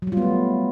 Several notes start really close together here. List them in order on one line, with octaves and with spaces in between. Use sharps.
F#3 G3 F4 B3 A3